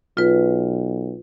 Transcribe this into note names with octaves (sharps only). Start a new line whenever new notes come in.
B1 F4 B4